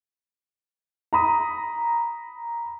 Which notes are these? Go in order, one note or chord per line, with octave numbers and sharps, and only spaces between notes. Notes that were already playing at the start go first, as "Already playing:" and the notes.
A#5 B5 D#6